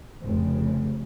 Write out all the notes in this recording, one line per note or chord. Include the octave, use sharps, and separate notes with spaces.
F1 C#3